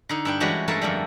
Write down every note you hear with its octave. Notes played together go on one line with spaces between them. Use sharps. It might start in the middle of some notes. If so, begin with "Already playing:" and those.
D3 D#4
G2 D4 G5
E3 G3 G#3 C#4 F#4 G4
G2 G#3 A3 A4 A#4 A5
F2 D3 G3